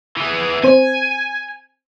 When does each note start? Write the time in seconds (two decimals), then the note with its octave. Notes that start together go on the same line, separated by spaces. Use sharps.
0.17 E3 G#4
0.64 C4 C5 G#5